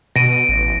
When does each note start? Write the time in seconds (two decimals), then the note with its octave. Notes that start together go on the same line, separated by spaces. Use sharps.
0.16 B2 A#6 D7 D#7
0.49 A1